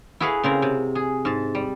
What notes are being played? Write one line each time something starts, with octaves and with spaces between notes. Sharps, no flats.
E4 F#4 G#4 B4 F5 F#5
C#3 C4 A#4
C3
G#4
G#2 A5
G3